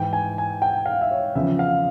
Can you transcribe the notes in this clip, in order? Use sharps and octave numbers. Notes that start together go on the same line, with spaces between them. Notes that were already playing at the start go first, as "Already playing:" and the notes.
Already playing: G#2 E3 G5
G#5
G#5
G5
F5
E5
C#5
E2 C#3 F3 E5
F5